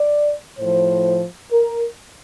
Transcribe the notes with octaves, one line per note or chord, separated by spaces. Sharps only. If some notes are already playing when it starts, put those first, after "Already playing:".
Already playing: D5
A2 F3 C5
A#4